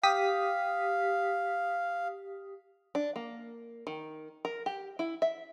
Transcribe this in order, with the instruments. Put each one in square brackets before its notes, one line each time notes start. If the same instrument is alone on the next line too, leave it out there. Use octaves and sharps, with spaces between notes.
[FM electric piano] G4 D#6 B6 [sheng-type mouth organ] F5
[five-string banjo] D4
A#3
D#3
A#4
G4
E4
E5